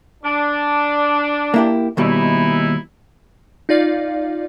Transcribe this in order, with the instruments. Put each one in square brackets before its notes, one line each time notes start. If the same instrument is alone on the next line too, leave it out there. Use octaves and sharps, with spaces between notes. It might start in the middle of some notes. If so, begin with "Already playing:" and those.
[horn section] D4
[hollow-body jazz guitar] A#3 E4 G4
[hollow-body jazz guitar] D#2 B2 G3 [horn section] G#3 D#4 E4
[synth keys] D#4 F4 D5 F5